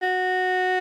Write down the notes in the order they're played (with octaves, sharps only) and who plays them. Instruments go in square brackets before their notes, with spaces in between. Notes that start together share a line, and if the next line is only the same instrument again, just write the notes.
[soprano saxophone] F#4